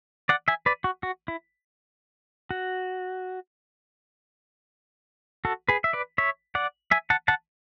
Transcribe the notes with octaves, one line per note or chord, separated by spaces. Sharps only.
D5 F#5
E5 G#5
B4 D5
F#4
F#4
E4
F#4
F#4 A4
G#4 B4
E5
B4 D5
C#5 E5
D5 F#5
E5 G#5
F#5 A5
F#5 A5